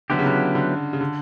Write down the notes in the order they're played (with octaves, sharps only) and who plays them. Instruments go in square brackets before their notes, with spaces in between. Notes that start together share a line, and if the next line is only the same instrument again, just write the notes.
[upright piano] D3 [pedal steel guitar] F#3 B3 E4 G4
[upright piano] C#3
D3
D3
C#3
D3